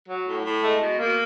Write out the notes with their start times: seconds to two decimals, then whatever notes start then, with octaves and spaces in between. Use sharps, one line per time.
0.08 F#3
0.27 A2
0.44 A2
0.62 G#3 A3
0.80 B2
0.98 B2 A#3